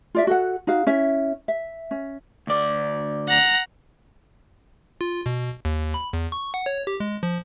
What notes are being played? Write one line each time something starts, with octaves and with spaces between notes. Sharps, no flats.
F4 D5 E5
F#4 A4 F#5
D#4 F#4 F5
C#4 E4 E5
E5
C#4
D2 D5
F#5 A#5
F4
B2
D#2
B5
E2
C#6
F#5
C#5
G4
G#3
F3